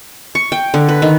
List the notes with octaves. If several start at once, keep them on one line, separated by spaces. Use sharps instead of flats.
C#6
G5
D3
B4
D#3